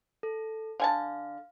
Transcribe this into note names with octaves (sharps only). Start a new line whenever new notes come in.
A4
D3 F5 G#5 A5